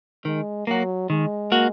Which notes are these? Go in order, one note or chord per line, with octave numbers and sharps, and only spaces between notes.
D#3 G#3
F#3 A#3 F#4
D#3 G#3
A#3 F#4